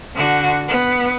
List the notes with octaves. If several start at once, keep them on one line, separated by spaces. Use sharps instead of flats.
D3 F#4
B3